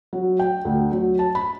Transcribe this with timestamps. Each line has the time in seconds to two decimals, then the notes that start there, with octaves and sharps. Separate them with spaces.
0.13 F#3
0.39 G5
0.65 D2
0.92 F#3
1.19 A5
1.35 B5